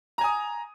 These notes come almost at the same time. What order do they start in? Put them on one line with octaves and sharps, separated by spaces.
A#5 G#5 D#6